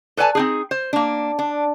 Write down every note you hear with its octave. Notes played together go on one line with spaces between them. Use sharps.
A4 B4 D5 G#5 A5
C4 D#4 G#4
C5
A#3 D4
D4